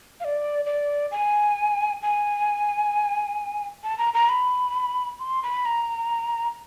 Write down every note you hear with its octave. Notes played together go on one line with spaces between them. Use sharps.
F5
D5
D5
G#5
G#5
A5
A#5
A#5
B5
C6
B5
A#5